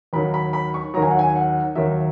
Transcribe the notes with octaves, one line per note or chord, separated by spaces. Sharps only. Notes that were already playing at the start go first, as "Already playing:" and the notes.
D#2 D#3 F#3 B5
B5
B5
C#6
D#2 D#3 F#3 A#5
G#5
F#5
G#5
F#5
D#2 D#3 F#3 E5